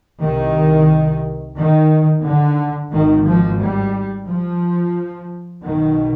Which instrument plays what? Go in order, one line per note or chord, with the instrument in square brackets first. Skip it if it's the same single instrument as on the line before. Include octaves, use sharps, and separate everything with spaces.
[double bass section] C2 C3 D#3
D#3
D3
G#1 G#2 D#3
F3
G3
F3
B1 B2 D#3